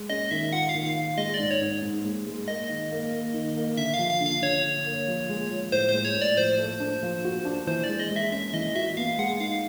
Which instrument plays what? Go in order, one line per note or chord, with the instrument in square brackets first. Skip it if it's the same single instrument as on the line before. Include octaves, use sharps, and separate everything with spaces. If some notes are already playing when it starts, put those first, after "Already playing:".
Already playing: [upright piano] G#3
[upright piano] C#4 [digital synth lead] D#5
[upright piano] D#3 [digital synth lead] E5
[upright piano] F4 [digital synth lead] F#5
[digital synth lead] F5
[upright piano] D#3
[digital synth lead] F5
[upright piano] F4
[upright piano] G#3 [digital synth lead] D#5
[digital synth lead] D5
[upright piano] G#2
[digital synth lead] C#5
[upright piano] G#2
G#2
G#3
G#3
[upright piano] A#3 [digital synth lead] D#5
[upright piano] D#3
A#3
A#3
D#3
A#3
[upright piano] D3 [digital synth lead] E5
[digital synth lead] F5
[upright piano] F3
[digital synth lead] F5
[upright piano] D3
[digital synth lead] F5
[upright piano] D3 [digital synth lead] C#5
[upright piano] D3
A#3
F3
G#3
F3
[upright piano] A2 [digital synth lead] C5
[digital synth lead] C5
[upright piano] G#3
[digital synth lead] C#5
[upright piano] A2
[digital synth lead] D5
[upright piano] F3 [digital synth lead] C5
[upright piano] A3
D4
F3
F#4
D4
[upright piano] E3 [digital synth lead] C5
[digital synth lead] D5
[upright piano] G#3
[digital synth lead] D#5
[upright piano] G#3
[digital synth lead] E5
[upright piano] C#4 [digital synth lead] E5
[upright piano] E3 [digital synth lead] D#5
[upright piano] F#4 [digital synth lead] E5
[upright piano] B3 [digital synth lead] F5
[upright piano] G#3 [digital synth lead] F#5
[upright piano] D#4 [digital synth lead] F5